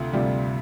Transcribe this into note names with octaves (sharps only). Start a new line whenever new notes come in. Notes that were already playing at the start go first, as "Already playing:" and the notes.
Already playing: D2 C3 F4
D2 C3 G3 F4